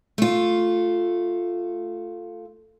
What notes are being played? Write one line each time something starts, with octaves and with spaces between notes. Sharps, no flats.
A3 F4